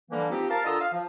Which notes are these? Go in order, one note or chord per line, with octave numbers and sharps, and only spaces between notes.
D3 E3 F3 G3 A#3
F3 C4 D#4 G4
A#4 F5 A5
D3 F4 D#5 A#5 D#6 E6
F5
F3